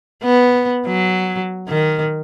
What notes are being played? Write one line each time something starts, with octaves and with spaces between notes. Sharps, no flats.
B3
F#3
D#3